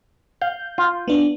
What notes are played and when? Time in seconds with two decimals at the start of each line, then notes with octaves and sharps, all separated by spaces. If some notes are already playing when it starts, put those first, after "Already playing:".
0.41 F5 G6
0.78 F4
1.08 B3 D4